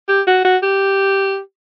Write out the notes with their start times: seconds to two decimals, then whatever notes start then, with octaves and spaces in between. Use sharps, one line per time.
0.08 G4
0.27 F#4
0.44 F#4
0.63 G4